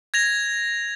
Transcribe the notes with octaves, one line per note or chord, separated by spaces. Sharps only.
G#6 A#6 F7